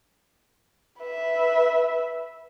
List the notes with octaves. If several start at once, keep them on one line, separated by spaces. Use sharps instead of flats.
B4 E5